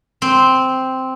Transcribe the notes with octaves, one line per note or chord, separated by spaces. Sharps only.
C4